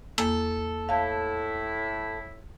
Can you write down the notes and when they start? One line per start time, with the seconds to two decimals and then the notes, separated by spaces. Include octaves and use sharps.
0.18 E2 A#3 A4
0.89 A2 E4 F5 A5